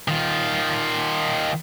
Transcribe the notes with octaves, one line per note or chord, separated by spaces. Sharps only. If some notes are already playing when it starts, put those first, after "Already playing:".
D#3 F4